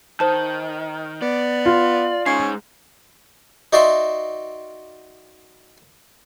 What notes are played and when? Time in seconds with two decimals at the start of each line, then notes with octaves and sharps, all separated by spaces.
0.20 D#3 C5 A5
1.22 B3 D5
1.66 F4
2.26 G#3 C#4 D#4 C7
3.73 D#4 F#4 D5 E5 C6